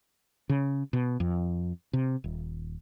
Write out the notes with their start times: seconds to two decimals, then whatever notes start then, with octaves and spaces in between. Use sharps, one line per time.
0.49 C#3
0.93 B2
1.20 F2
1.93 C3
2.24 D#1